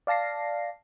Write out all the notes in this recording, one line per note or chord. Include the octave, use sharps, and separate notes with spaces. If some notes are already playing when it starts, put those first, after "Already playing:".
D5 F5 A5 A#6 C7